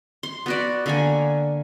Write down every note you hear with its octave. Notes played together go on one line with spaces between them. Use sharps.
C6
B3 F#4 D5
D3 A#3 G#5